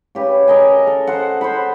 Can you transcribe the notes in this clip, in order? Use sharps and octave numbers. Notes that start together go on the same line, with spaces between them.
C#3 G4 B4
A#4 D#5 G#5
A4
C5 F#5
C5 F#5 B5